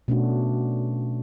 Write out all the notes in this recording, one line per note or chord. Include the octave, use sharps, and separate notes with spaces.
B2 A3 C#4 D4 F#4